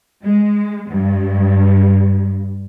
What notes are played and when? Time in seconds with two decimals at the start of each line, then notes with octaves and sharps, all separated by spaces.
0.23 G#3
0.88 G2